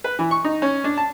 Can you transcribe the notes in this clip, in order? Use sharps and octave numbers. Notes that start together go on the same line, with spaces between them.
B4
E3
C#6
D#4
C#4
D4
A5